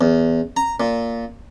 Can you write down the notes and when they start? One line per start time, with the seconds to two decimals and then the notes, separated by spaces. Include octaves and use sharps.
0.01 E2
0.57 A#5
0.80 A#2